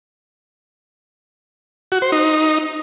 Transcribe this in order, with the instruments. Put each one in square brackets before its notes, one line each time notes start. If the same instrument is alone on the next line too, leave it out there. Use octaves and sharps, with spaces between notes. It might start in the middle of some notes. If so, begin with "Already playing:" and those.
[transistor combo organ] F#4
C5
D#4